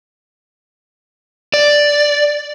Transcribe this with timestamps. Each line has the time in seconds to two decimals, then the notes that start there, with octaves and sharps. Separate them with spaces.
1.54 D5